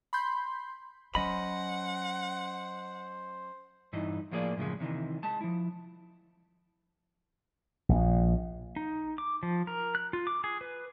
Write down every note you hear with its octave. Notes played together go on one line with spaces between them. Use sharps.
B5 C6 G6
F#3 C#4 C5 D#5 F#5 B5
G2 E3 D#4
A2 F3 A#3 F4 G#4 D5
F#2 A2 C#3 F3 G#3
C3 D#3 E3
G#3 A5
F3 E4
A#1
D#4
D6
F3
A#4
F#6
F4
D6
G#4
B4